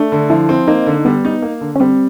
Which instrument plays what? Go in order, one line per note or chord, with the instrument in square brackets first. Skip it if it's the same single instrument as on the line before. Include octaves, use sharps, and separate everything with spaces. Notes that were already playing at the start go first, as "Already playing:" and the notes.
Already playing: [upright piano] A3 [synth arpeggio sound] D4
[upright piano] D3
[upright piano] F3 [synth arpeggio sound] E4
[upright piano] C4
[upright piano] A#3 [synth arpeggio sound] D#4
[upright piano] D3
[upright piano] G3 [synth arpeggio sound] B3
[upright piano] D#4
A#3
D3
[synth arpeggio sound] C#4
[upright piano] G3 [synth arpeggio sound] C4